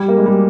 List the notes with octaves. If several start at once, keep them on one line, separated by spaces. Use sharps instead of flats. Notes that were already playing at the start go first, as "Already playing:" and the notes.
Already playing: G3
A#3
G#3
G3